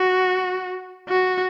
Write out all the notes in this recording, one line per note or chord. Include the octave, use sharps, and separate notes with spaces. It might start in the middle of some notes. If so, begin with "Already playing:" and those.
Already playing: F#4
F#4